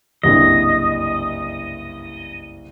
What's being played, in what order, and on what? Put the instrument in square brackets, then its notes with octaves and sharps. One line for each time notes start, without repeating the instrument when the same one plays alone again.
[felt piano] F#1 C2 G2 [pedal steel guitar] D#5